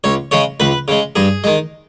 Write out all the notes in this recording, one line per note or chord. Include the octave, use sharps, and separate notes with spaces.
C#2 C#5
C#3 G#3 C#5
C#2 B4
C#3 G#3
G2 G#4
D#3 G#3